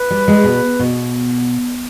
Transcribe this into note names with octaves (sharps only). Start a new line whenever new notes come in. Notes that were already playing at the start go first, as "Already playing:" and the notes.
Already playing: B4
G3
G#3
B2
B2